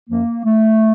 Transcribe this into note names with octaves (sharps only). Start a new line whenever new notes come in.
F#2 F3 A#3
A3